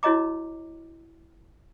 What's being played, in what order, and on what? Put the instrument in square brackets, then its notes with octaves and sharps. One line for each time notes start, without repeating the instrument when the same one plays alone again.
[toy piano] E4 F#4 C#5 D#5 A#5 D6